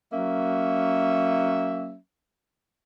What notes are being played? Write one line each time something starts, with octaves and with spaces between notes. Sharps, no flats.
F#3 A#3 C#4 E5